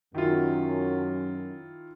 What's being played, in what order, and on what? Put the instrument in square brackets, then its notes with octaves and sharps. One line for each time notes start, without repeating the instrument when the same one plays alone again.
[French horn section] F#2 [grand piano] D#3 E4 F4